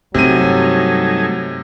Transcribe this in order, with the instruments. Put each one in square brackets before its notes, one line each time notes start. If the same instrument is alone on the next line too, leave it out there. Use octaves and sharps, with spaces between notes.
[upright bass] G2 [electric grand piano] C3 D#7 [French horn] F#3 [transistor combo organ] A3 D#4 G#5